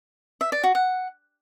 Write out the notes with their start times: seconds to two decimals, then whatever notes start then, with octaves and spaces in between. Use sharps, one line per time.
0.41 E5
0.52 D5
0.63 F#4
0.75 F#5